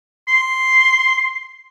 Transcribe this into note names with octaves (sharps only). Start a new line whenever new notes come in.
C6